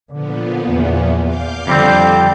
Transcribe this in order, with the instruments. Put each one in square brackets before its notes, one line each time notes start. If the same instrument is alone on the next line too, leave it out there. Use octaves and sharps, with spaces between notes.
[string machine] A#2 F3 B3 [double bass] D3
[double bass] E2
[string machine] F5 D6 G6
[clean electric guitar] F2 G3 C4 [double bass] D3